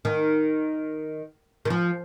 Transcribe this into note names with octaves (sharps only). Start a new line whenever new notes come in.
D#3
D#3
F3